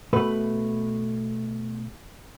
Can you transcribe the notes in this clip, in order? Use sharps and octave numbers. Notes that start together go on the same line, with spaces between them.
B2 A3 B4